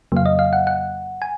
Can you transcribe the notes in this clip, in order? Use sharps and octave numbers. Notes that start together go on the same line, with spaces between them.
F2 C#3 F#3 A#3 F5
D#5
F5
F#5
F#5
G#5